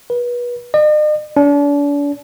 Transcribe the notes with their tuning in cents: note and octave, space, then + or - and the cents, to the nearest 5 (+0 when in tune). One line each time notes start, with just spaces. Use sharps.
B4 -30
D#5 -45
D4 -40